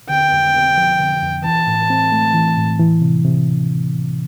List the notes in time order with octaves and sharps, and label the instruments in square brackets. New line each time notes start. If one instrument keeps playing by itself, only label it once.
[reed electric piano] D3 [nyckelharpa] G5
[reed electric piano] F2
C4
F3
D3
F2
[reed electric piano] E3 [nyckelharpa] A5
[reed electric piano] A2
C4
A3
E3
A2
E3
C3
C3